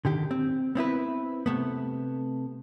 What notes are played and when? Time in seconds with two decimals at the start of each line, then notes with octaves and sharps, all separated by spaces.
0.05 D3 D#3 G4
0.31 C4
0.75 B3 C4 E4 B4
1.46 C3 A3 B3